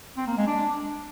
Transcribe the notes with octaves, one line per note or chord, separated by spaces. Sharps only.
C4
A#3
G#3
D4